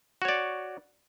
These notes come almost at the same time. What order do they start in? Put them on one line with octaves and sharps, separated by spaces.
F#4 C#5 D5